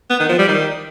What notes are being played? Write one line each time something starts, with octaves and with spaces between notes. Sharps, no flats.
B3
D#3
F3
G3
D#3